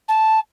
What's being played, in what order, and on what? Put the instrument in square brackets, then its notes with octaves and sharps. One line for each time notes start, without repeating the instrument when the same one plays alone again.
[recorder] A5